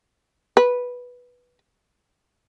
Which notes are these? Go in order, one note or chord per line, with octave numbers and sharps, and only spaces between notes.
B4